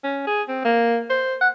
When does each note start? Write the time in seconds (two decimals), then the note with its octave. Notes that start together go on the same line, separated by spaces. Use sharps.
0.04 C#4
0.27 G#4
0.48 C4
0.64 A#3
1.10 C5
1.41 F#5